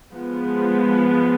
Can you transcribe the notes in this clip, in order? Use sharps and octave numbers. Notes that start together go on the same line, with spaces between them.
F3 G#3 B3